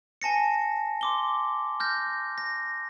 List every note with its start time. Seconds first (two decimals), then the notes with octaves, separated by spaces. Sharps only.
0.22 G#5 A5 A#6 C#7
1.01 C6 D6 G7
1.80 F6 G6 A#6
2.38 A#6